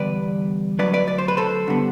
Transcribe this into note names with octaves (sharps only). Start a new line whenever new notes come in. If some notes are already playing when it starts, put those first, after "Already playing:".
Already playing: E2 D3 G3 B4 D5
D2 C3 F#3 B4 D5
B4 D5
D5
C5
B4
A4 C5
G2 D3 G3 B3